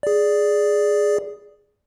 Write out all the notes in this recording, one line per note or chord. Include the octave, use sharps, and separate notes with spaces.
G#4 D5